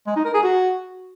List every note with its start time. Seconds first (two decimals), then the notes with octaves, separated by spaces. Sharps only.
0.07 G#3
0.16 D#4
0.25 A#4
0.34 G#4
0.43 F#4